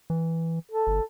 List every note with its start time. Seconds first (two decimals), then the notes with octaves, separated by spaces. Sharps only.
0.10 E3
0.72 A4
0.87 G1